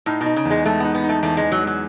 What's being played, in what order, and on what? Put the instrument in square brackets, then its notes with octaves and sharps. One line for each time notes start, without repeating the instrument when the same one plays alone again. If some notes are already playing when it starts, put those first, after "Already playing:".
[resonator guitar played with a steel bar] A2 [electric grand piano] D#4
[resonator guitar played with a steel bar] B2
[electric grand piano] D#4
[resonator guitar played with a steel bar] C#3
[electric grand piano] E2
[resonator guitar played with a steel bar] G#3
[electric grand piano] G#3 [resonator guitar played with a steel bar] A3
[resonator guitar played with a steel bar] B3 [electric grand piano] D#4
[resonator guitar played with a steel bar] B3
[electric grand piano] D#4
[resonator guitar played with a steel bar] A3
[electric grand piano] E2 [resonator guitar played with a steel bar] A3
[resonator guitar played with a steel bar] G#3
[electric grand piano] E2
[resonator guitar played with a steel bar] F#3
[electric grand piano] G#3
[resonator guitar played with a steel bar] F#3